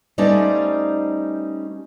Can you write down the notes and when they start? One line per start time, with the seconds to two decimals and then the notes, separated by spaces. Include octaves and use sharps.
0.18 G3 A3 C#4 D#4 C5 D5